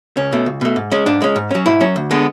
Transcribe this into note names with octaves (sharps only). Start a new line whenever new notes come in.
C#2 C#4
B2 A3
C#2
B2 A3
G#2
G#3 C#4
G#2 D4
G#3 C#4
G#2
F#3 C#4
G#2 E4
F#3 C#4
D2
D3 G#3 B3